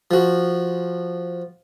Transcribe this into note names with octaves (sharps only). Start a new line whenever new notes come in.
F3 F#4